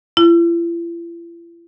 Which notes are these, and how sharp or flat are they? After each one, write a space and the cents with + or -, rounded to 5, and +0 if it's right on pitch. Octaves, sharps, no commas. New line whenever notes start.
E4 +45